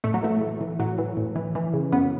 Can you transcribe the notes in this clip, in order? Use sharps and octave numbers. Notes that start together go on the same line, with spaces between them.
A2 A3
F#3
E3 A3
A2
E3
A2 F#3
E3
A2
E3
E3
C#3
F#2 B3